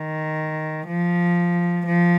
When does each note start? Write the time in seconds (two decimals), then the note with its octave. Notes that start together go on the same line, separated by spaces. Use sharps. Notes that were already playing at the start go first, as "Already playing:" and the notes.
Already playing: D#3
0.87 F3
1.86 F3